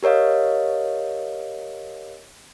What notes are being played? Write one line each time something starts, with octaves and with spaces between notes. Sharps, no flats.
G4 A#4 C#5 D#5 F5